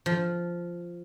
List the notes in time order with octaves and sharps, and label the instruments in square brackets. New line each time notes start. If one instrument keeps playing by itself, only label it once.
[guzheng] F3